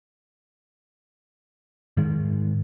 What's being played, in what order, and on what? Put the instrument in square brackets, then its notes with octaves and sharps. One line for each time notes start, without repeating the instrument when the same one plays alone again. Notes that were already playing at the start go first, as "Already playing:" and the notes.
[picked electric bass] G#2 D#3 G#3